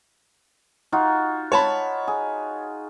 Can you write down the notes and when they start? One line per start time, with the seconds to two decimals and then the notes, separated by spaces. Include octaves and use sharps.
0.92 D#4 F4 F#4
1.52 C#5 A5 B5
2.08 G#4